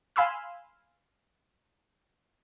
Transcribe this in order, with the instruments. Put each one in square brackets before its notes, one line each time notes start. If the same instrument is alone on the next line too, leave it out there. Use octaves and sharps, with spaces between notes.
[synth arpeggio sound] F5 G#5 B5 C6 E6